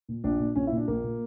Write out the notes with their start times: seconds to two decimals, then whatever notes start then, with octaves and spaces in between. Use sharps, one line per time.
0.09 A#2
0.24 A#1 D4
0.40 A#2
0.55 A#1 C#4
0.67 E4
0.72 A#2
0.77 D4
0.88 A#1 A#3
1.04 A#2